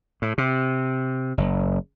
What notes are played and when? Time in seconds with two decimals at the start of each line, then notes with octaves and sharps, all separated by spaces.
0.22 A2
0.38 C3
1.38 F#1